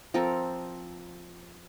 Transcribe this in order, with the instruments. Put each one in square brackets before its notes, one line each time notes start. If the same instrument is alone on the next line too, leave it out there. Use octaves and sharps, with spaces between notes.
[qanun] F3 C4 A4 A#4